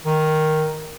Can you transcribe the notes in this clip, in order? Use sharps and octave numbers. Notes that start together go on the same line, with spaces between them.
D#3